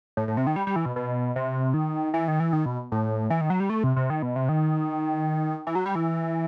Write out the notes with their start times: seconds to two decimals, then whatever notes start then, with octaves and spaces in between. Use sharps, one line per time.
0.17 A2
0.28 A2
0.37 C3
0.47 D#3
0.56 G3
0.67 G3
0.76 E3
0.86 B2
0.96 B2
1.36 C3
1.74 D#3
2.14 E3
2.28 D#3
2.40 E3
2.53 D#3
2.66 B2
2.92 A2
3.30 E3
3.41 D#3
3.50 F#3
3.60 G3
3.70 A3
3.84 C3
3.96 C3
4.10 D#3
4.22 B2
4.36 C3
4.49 D#3
5.67 E3
5.75 F#3
5.86 G3
5.95 E3